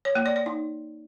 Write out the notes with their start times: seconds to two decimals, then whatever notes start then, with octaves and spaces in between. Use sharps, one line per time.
0.05 C#5
0.15 A#3
0.26 D5
0.36 D5
0.46 D#4